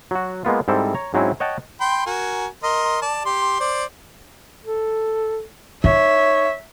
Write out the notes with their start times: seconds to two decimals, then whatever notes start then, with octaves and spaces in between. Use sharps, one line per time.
0.11 F#3 F#4
0.45 G#3 A#3 B3 F4
0.68 G#2 G3 C4 E4 A4
0.95 C#5 A#5
1.14 G#2 F#3 C4 C#4 E4
1.40 C#5 D#5 F#5 G5 A5
1.80 G5 B5 C6
2.06 F#4 A#4 G#5
2.63 A#4 D#5 C6
3.02 D5 A5
3.26 G4 C6
3.60 C5 D5
4.64 A4
5.84 D#4 C#5 E5